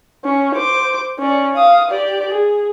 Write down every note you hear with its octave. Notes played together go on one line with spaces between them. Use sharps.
C#4
C5 D6
C#4 D5
F5 D#6
G4 D5
G#4